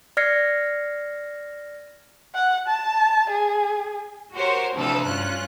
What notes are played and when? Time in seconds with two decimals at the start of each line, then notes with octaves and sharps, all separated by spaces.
0.17 D5 F6 G#6 A#6 C7 C#7
2.34 F#5
2.68 A5
3.30 G#4
4.34 F#4 G4 A#4 C5 C#5
4.74 D2 C3 E3 F3 A4
5.04 G2 C#4 F4 F#6